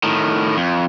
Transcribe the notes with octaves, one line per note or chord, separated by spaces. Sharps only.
A2 D#3
F2